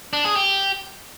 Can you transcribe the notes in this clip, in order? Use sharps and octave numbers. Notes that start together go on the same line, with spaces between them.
D4
G#4
G4